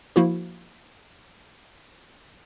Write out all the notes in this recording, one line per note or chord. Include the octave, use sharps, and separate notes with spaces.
F3 A#3 E4 F#4